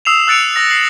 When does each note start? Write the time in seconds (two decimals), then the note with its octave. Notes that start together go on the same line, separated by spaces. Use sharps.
0.05 D#6 E6 C7 E7 F7
0.27 E6 F#6 A6 C#7 D7 F7
0.56 E6 A#6
0.70 C7 F#7